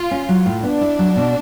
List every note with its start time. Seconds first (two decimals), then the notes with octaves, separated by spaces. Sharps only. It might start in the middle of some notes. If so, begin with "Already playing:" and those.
Already playing: F4
0.11 C#4
0.29 F#3
0.46 A2
0.63 B3 D4
0.81 E4
0.99 F#3
1.16 B2